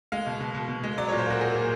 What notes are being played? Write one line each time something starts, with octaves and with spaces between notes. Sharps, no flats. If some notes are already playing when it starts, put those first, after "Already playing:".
G#3 F5
B2
B2
B2
B2
G#3
F#3 D5
C#5
A#2
C5
A#3 F#4
F#3 G#4
A#2